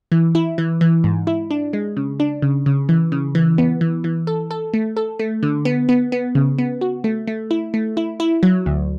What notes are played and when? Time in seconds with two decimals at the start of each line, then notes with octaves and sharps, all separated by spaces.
0.12 E3
0.35 E4
0.58 E3
0.81 E3
1.04 G#2
1.27 E4
1.51 D4
1.73 G#3
1.97 C#3
2.20 D4
2.42 C#3
2.66 C#3
2.89 E3
3.12 C#3
3.35 E3
3.58 B3
3.81 E3
4.04 E3
4.27 A4
4.51 A4
4.74 A3
4.97 A4
5.19 A3
5.43 D3
5.65 B3
5.89 B3
6.12 B3
6.35 C#3
6.59 B3
6.81 F#4
7.04 A3
7.27 A3
7.51 E4
7.74 A3
7.97 E4
8.20 E4
8.43 F#3
8.66 D2